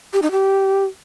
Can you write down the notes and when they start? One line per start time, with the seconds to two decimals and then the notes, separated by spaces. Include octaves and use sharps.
0.13 G4
0.22 D#4
0.31 G4